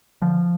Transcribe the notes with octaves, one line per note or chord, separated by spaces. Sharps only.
D3 F3